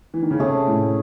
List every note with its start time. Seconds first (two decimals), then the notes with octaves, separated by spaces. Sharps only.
0.14 E3
0.22 D#3
0.31 C#3
0.39 C3 A3 C#4 G#4
0.67 A2